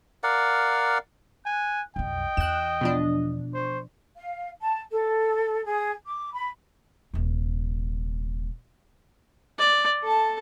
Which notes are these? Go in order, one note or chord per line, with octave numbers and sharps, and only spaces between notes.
A#4 D5 F5 F#5
G#5 F#6
B1 F2 D#5 G5
E2 F#6 E7
B2 F3 D4
C5 C#6
F5
A5
A4
G#4
D6
B5
D#1 C3
D5
A4 A5